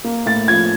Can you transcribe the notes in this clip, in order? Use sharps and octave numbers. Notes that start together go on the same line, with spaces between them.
A#3
A2 A6
F3 G#6